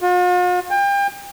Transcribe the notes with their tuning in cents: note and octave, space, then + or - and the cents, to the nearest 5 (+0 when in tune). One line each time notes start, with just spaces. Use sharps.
F4 +45
G5 +35